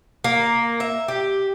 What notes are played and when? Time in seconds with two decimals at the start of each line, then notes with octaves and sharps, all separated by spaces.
0.24 A#3
0.80 E5
1.08 G4